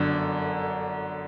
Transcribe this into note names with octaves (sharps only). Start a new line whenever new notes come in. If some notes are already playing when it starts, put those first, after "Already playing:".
Already playing: G1 F#2 D3